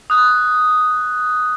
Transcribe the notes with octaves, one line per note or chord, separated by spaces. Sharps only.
D#6 F#6